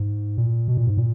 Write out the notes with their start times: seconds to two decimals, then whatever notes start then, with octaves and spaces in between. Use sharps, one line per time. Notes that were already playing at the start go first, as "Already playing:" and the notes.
Already playing: G#2
0.38 A#2
0.68 B2
0.77 A#2
0.87 G#2
0.97 A#2